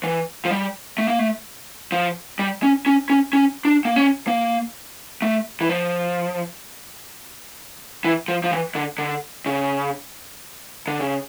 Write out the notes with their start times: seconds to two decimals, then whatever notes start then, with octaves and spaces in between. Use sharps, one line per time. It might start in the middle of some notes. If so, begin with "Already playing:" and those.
0.04 E3
0.45 F3
0.51 G3
0.98 A3
1.08 A#3
1.19 A3
1.92 F3
2.39 G3
2.63 C#4
2.86 C#4
3.10 C#4
3.33 C#4
3.65 D4
3.85 A#3
3.96 C#4
4.28 A#3
5.22 A3
5.61 E3
5.69 F3
8.05 E3
8.28 F3
8.44 F3
8.51 E3
8.75 D3
8.98 D3
9.46 C#3
10.87 D3
11.01 C#3